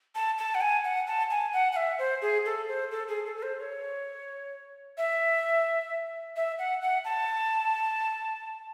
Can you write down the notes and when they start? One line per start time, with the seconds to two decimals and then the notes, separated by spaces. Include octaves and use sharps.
0.15 A5
0.38 A5
0.55 F#5
0.61 G#5
0.84 F#5
1.07 A5
1.30 G#5
1.53 F#5
1.72 F#5
1.76 E5
1.99 C5
2.22 G#4
2.46 A4
2.68 C5
2.91 A4
3.08 G#4
3.26 A4
3.37 A4
3.43 C5
3.60 C#5
4.98 E5
6.36 E5
6.59 F#5
6.82 F#5
7.05 A5